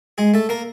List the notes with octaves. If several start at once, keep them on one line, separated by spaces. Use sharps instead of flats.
G#3 G#4
A3 A4
A#3 A#4